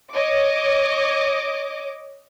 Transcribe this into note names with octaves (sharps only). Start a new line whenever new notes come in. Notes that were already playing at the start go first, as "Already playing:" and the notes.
C#5 D#5 D6